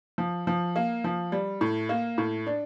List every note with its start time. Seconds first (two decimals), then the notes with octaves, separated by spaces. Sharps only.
0.18 F3
0.47 F3
0.76 A#3
1.04 F3
1.32 G3
1.61 A2
1.89 A#3
2.18 A2
2.47 D4